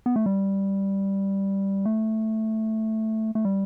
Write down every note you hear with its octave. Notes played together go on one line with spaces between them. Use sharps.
B3
A3
G3
A3
A3
G3